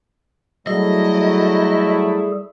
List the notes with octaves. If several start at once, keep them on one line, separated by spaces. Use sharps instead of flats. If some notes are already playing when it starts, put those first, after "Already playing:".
F#3 G3 A3 E4 G#4 A4 D#5